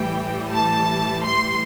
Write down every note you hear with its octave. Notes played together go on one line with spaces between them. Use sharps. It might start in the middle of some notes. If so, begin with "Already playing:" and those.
Already playing: A2 E3 G3 G5
A5
C6